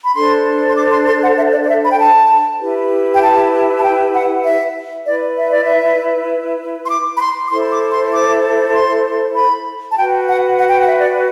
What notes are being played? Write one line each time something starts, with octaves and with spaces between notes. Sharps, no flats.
B5
D4 A4 C5 C6
C6
D6
C6
C6
F#5
E5
D5
D5
E5
B5
G5
A5
E4 G4 B4
G5
A5
A5
G5
F#5
E5
E4 B4 D5
E5
D5
E5
C6
D6
B5
C6
D6
E4 A4 C5 C6
D6
C6
D6
C6
B5
A5
F#4 B4 G5
F#5
F#5
G5
F#5
E5
D5